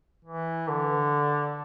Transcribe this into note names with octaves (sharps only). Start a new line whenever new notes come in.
E3
D3